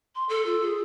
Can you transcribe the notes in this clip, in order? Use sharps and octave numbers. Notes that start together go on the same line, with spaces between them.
C6
A4
F4
G#4